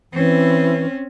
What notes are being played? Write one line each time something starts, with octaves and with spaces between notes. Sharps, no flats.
E3 C4 C#4